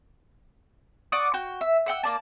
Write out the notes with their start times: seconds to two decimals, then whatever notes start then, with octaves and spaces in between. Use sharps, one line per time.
1.12 D5 F#5 C#6 D#6
1.34 F#4 G5
1.61 E5
1.86 E5 F#5 G5 E6
2.03 A#3 D5 A5